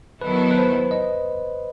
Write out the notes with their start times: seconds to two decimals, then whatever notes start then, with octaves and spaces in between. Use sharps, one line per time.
0.21 D#3 F#3 B3 E4 A4 B4
0.51 B4
0.57 C5
0.91 D#5